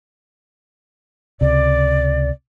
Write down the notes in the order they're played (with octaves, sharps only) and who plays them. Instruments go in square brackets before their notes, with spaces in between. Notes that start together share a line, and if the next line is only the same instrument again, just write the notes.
[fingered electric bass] C#2 C3 [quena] D5